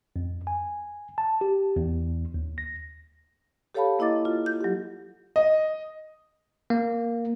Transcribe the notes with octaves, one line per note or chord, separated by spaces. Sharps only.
F2
G#5
A5
G4
E2
D#2
A#6
G4 A4 C#5 F5 A5 B5
A#3 E4 D#5 D6 A6
F4
G6
F#3 G4
D#5
A#3